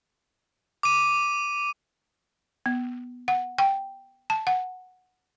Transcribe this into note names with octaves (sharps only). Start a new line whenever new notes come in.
D6 D#7
B3
F#5
G5
A5
F#5